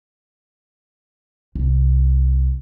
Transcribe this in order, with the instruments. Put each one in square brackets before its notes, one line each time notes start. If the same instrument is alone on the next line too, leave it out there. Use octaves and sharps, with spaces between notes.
[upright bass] C2